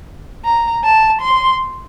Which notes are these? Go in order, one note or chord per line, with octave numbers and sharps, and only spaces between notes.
A#5
A5
C6